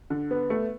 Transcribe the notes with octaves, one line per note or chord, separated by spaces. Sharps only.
D3
B3
A3